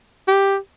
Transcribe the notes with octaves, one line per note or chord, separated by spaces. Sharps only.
G4